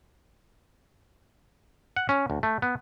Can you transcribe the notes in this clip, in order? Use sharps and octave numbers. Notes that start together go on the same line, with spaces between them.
F#5
C#4
D2
A3
B3